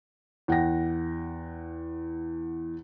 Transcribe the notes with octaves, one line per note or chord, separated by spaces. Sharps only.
E2 F#5 G5 A#6